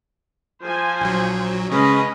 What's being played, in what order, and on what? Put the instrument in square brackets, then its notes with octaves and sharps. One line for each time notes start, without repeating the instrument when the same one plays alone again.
[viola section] F3 C5 G#5
[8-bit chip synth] A#1 F#3
[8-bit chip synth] C#3 G#3 [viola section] C#4 B4 D#5